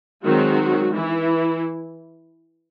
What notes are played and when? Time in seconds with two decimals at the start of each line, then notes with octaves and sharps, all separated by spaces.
0.22 D#3 F#3 G#3 C4 F#4
0.95 E3 E4